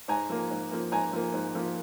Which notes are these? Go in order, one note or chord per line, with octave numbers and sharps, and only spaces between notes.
G#2 G#5 A#5
F3 A#3
G#2
F3 A#3
G#2 G#5 A#5
F3 A#3
G#2
F3 A#3